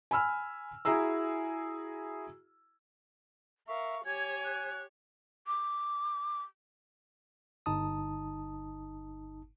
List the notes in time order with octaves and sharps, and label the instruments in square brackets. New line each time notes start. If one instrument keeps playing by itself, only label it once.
[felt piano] G#5 B5 E6 F6
E4 F#4 G#4 A#5 E6
[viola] A#4 F5 [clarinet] E5 [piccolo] C#6
[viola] G4 C#5 [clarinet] G#5 [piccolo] G#6
[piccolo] F#6
[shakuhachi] D6
[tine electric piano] G1 D#4 A5 D#6